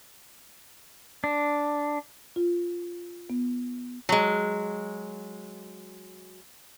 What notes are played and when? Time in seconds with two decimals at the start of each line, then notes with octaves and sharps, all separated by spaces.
1.24 D4
2.36 F4
3.30 B3
4.09 F#3 G#3